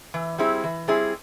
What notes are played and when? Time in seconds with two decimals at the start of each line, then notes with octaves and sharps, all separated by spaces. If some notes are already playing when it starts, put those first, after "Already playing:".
0.14 E3
0.38 G3 C4 E4 G#4
0.64 E3
0.88 G3 C4 E4 G#4